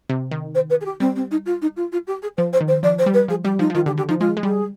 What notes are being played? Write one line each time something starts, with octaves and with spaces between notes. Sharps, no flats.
C3
D#3
C5
B4
G#4
G4
G3 C4
C4
D#4
F4
D#4
F4
F4
G4
G#4
F3 C5
C5
D#3
C5
F3 D5
C5
G3
B4
F3 G#4
G3 G4
F3 D#4
F3
D#3 F4
D3 G4
D3 G4
F3 D#4
G#3 F4
G#3
G3 G#4